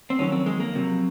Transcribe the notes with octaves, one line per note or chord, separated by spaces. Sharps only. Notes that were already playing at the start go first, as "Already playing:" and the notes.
C4
F2 D#3 F#3 C#4
C4
G#3
A#3
F2 C3 F#3